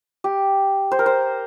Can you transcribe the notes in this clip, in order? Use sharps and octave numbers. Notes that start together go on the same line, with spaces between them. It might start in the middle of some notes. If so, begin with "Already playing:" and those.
G4
C5
A#4
C5